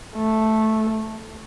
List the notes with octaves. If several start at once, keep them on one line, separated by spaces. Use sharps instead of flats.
A3